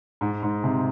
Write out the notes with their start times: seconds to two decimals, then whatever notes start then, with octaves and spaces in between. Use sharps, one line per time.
0.21 G#2
0.43 G#2
0.64 C3